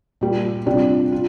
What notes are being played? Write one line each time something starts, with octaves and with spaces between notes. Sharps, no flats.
A#2 G3 A#3
C3 G3 D4 F4
F4